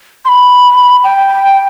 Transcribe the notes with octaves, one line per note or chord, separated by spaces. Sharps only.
C6
B5
G5